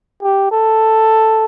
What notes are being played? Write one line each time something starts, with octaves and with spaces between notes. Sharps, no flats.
G4
A4